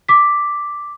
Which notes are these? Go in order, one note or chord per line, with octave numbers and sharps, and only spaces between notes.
D6 B6